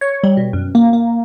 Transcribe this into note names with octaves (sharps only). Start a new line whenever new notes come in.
C#5
G3
B2
F#2
A#3
A#3